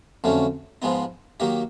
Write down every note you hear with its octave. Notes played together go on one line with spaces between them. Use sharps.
F2 D3 F#3 A3 C#4
G#2 F3 G#3 B3 D#4
D#3 F#3 A#3 D#4 G4